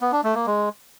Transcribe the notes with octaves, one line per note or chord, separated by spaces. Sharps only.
B3
D4
A3
A#3
G#3